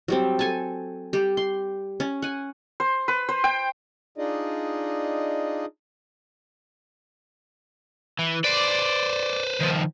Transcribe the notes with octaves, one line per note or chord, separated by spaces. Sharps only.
F#3 G3 C4
A4 G#5 A5
G3 G4
C6
C#4
F#5 G#5
C5
B4
C5
G5
D4 D#4 F4 G#4 D5 D#5
E3
B4 C5 D5
D#3 F3